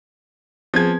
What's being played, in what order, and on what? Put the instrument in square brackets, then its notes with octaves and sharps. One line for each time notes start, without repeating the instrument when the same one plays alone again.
[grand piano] F3 G#6 [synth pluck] B3 C4 G#4